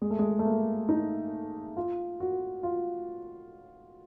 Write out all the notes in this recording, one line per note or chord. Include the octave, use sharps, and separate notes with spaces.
G#3
A3
G#3
A3
A#3
D#4
F4
F#4
F4